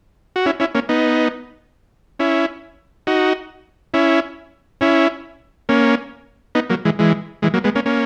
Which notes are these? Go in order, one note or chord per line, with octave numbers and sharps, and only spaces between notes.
F#4
C#4 E4
C#4 E4
A#3 C#4
B3 D#4
C#4 E4
D#4 F#4
C#4 E4
C#4 E4
A#3 C#4
B3 D#4
F#3 A#3
E3 G#3
E3 G#3
E3 G#3
F#3 A#3
G#3 B3
A#3 C#4
A#3 C#4